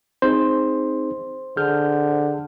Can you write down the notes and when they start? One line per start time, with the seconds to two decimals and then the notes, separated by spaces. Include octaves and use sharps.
0.22 C4 D#4 G#4 C5
1.57 D3 G#4 F6 G6